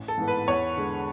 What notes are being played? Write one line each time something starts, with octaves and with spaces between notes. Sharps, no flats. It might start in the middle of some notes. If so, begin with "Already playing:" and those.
Already playing: A1
A4
G#2 E3 B3 E4
B4
E2 C#5
D3 G#3